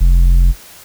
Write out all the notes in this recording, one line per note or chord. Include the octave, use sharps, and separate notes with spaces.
F1